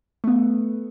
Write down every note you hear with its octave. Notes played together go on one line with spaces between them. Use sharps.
A3 B3